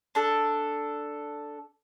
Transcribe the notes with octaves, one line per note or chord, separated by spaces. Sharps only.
D4 A4